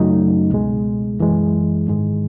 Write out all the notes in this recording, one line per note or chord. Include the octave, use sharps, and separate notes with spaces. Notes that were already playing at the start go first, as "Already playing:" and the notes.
Already playing: F#2 C#3 F#3 A3 D#4
C#2 B2 G#3
F#2 E3 G#3
G#2 D#3 G#3